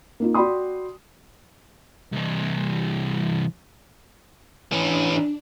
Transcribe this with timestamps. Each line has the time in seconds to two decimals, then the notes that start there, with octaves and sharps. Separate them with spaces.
0.20 A#3 D#4 F4
0.34 F#4 D5 G5 B5 C6 D#6
2.13 C2 E3
4.73 E3 C#4 D4